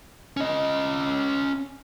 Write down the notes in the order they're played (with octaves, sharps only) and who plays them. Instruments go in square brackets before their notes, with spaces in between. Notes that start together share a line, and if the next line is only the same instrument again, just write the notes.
[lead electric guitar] C#4 D#5